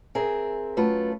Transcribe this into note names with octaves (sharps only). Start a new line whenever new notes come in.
C4 G#4 A#4 E5
F#2 A3 F4 B4